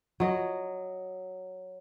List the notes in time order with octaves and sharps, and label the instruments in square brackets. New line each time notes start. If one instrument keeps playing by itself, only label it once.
[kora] F#3 D#5